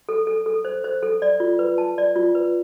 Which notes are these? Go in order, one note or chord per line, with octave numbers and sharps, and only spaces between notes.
A4
A4
A4
C5
C5
A4
D5
F4
B4
A5
D5
F4
B4